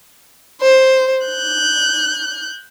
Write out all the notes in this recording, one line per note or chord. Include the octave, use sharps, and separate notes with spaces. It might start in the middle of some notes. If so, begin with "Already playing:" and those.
C5
F#6 G6